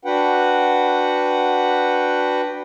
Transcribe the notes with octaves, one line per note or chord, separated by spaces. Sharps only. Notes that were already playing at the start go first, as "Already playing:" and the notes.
D4 F#4 B4 F#5 G5